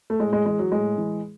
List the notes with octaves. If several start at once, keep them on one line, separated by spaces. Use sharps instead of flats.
A3
A2 G#3
G#3
E3 G#3
F#3
A2 G#3
E3